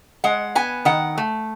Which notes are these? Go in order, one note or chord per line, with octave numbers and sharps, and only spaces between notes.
G#3 F#5
B3 G#5
D#3 F#5
A3